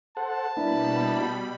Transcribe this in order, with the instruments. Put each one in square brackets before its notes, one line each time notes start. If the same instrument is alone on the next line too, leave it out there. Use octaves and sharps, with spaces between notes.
[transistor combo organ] A4 C5 F#5 [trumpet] A5
[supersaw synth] B2 G3 B5 [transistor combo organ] A#3 B4 [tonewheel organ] D4 E4